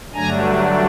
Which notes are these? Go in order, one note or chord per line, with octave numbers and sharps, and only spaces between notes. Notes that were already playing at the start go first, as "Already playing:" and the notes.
G2 D3 F#3 A3 D4 G#5 A#5